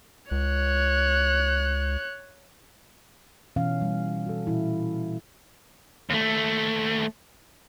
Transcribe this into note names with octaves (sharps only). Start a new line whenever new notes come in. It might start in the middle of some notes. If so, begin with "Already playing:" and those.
C#2 C#5 F#6
B2 E3 C#4 F5
G3
F#4 A4
A#2 E3 E4
D#2 A3